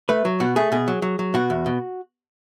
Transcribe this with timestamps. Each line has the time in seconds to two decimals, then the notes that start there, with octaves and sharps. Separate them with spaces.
0.09 A3 B4
0.25 F#3
0.40 B2 F#4
0.56 A3 G#4
0.72 B2 G#4
0.88 F#3
1.02 F#3
1.19 F#3
1.34 B2 F#4
1.50 E2
1.66 B2